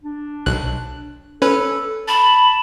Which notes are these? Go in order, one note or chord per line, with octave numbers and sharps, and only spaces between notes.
D4
B1 F#6
C#4 A4 B4
A5 B5